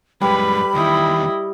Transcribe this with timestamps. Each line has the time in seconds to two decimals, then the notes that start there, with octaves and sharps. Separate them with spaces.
0.22 F#2 G3 G#3 B4 B5
0.74 E2 D#3 E4 D#5